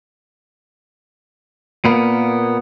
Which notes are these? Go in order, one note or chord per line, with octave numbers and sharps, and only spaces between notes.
A#2 A#3 B3